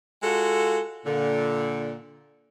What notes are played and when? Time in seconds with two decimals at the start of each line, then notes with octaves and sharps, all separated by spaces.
0.22 G#3 F4 F#4 A4
1.05 A#2 D3